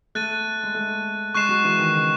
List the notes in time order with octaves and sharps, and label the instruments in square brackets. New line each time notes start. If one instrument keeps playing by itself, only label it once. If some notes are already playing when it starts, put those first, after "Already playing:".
[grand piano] A3 [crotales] F#6 A6 D#7
[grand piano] G#3
A3
[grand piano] G#3 [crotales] C#6 F#6 C7 E7
[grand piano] F#3
E3
D#3
C#3